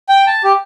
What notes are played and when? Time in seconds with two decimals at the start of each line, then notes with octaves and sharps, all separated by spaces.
0.09 G5
0.27 A5
0.44 G4